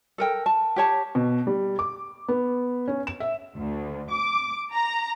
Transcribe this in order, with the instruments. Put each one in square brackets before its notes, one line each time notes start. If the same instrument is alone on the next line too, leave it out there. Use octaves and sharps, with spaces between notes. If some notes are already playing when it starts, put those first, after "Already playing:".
[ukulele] A4 A#4 G5
A5
G4 C#5 A5
[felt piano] B2
G3
D6
B3
C#4
E7
E5
[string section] D2
D6
A#5